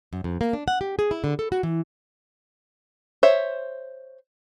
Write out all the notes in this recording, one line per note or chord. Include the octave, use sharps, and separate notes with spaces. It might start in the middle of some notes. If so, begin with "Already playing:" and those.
F#2
F2
A#3
D4
F#5
G4
G#4
E4
D3
A4
F#4
E3
C5 C#5 E5